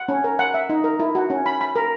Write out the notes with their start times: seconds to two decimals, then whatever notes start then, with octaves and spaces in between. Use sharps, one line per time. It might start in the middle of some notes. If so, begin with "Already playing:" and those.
Already playing: F#5
0.09 C#4
0.24 A#4
0.39 F#5
0.54 E5
0.69 D#4
0.84 A#4
0.99 E4
1.15 F#4
1.30 C#4
1.46 B5
1.61 B5
1.76 A#4